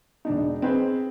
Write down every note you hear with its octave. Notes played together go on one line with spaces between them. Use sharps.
E1 D4 D#4
C4 D#4 G#4 B4 C5